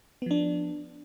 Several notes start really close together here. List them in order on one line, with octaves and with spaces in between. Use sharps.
B3 F3 D4